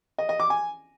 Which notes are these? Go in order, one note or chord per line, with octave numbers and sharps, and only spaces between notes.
D#5
D#5
D6
G#5